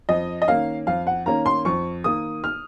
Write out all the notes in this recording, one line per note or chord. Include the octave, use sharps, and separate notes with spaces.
F2 D#5
D#5
D#3 A#3 C#4 F5
F2 F5
F#5
D#3 A#3 C#4 A#5
C6
F2 C#6
D#3 A#3 D#6
F6